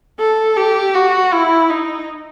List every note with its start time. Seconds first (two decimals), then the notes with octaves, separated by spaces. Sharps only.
0.19 A4
0.57 G4
0.95 F#4
1.33 E4
1.70 D#4